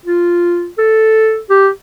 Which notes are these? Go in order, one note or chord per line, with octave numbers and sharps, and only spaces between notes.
F4
A4
G4